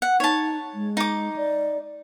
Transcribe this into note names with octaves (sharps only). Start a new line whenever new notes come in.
F#5
D#4 C#5 A5
G#3
D#4 D6
D5